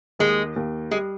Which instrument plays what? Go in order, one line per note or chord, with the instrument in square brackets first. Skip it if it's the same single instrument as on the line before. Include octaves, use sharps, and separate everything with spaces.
[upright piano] D#2 [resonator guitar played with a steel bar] G#3
[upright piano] D#2
[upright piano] G3 [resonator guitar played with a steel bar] G#3